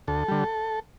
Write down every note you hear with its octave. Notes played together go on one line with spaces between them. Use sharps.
D2 A4
D3 G3